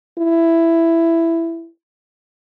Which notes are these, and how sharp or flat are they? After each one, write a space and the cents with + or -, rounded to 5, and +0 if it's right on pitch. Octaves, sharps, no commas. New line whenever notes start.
E4 +10